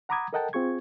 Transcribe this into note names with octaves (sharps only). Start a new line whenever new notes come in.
F#5 A#5 B5 D6 D#6 G#6
A4 A#4 D#5 F#5 G5 A5
C4 F4 G#4 C#6 G#6